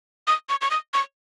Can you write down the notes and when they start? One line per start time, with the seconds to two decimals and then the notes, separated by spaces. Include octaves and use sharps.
0.27 D#6
0.49 C#6
0.61 C#6
0.71 D#6
0.94 C#6